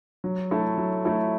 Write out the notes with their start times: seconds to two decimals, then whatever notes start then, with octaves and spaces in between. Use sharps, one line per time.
0.24 F#3
0.51 A3 E4 A4
0.78 F#3
1.05 A3 E4 A4